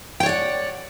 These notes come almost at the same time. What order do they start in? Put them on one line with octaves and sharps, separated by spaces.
G5 C#5 D5 F#5